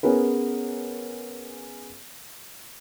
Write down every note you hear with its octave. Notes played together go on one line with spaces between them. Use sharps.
B3 C#4 G#4 A#4 B4